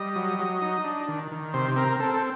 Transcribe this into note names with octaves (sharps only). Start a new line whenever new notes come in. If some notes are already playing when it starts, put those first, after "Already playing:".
Already playing: G3 D#5
F#3
F#3
D#4
D4
D#3
D#3
C3 C5
C4 A#4
C4 A4
A4